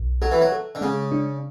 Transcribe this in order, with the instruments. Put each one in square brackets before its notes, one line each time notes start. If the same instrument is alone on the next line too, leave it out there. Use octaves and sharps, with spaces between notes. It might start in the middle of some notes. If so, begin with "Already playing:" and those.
Already playing: [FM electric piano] B1
[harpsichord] F#3 [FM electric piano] A4
[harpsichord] E3
F#3
[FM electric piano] A4
[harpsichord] D3
[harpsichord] C#3 [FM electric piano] G#3
[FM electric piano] D4